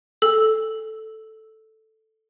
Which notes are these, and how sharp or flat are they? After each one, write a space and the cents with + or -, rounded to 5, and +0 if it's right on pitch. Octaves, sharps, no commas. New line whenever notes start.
A4 +0 E6 -5